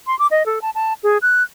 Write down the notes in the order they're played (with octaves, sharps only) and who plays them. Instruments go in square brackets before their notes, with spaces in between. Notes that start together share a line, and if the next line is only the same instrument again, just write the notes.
[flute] C6
D6
D#5
A4
A5
A5
G#4
F#6